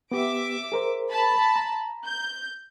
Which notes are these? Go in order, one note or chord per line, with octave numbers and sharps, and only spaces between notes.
B3 G4 E5 D6 D7
G#4 A#4 C5
A5 B5
A#5
G6